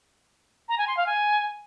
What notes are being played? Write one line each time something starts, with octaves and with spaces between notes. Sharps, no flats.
A#5
G#5
C6
F5
G#5